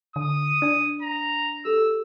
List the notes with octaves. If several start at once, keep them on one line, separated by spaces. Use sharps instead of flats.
D3 D#6
D4 D5 G#5
A#5
G4 A4 E6